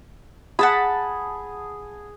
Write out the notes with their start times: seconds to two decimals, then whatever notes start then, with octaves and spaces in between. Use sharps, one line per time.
0.59 G#4 F#5 A5 B5